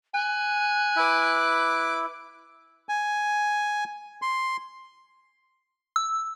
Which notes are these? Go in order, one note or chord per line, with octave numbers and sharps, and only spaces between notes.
G#5 F#6
E4 B4 D6
G#5
C6
E6